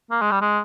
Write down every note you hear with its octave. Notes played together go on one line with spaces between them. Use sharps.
A#3
G#3
G3
G#3